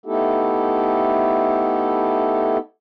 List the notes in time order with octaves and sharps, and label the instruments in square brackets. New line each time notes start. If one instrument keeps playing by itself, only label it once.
[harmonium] A3 B3 D#4 E4 G4 A4